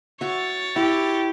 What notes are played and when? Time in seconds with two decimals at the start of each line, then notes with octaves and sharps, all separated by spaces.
0.21 F#4 C#5 E5 A6
0.76 E4 G4